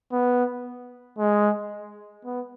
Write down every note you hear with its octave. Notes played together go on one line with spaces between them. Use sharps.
B3
G#3
B3